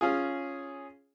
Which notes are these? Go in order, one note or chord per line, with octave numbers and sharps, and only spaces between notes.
C#4 F4 G#4